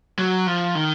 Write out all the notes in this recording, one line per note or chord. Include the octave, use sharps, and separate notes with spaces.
F#3
F3
D#3